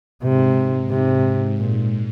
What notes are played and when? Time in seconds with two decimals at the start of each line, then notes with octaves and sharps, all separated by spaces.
0.23 G#2 C3
0.90 C3
1.58 A#2